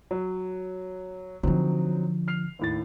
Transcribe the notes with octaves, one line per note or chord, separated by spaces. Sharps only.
F#3
D3 F3 F#3 C4 D#4
F6 C7 F7
D#2 A2 A6